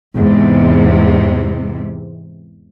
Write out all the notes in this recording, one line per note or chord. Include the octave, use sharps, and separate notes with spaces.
E2 G#2 C3